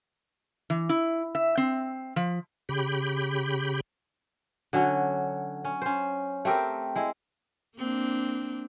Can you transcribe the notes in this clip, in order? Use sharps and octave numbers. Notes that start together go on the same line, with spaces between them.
E3
E4
E5
C4
F3
C#3 G4 B5 G6
D3 F#3 C#4
C#4
C#4 C5
A3 C4 G4 A#4
G#3 E4
A#3 C4 D4